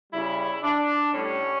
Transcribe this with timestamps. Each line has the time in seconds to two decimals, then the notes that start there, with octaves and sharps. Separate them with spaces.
0.13 C#3 G3 E4
0.63 D4
1.13 A2 G3 C#4